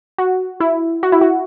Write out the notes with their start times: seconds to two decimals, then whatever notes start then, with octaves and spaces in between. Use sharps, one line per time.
0.18 F#4
0.60 E4
1.03 F#4
1.12 E4
1.21 F#4